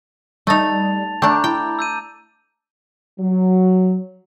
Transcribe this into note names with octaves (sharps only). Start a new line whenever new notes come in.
G3 A3 D#4 A5 A6 F7
A3 D4 G5 A#5 D6 G6
E4 G5
E6 G6 D#7
F#3